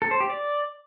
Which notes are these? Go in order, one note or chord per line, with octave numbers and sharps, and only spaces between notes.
A4
C5
G4
D5